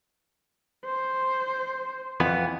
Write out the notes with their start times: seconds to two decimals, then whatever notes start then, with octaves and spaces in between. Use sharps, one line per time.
0.85 C5
2.20 F2 E3 B3